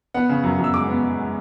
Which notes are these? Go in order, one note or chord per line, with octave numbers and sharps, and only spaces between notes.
B3 F#5
C#3
F#2
F#2
E6
G#3 D6
B3
G#3
G#3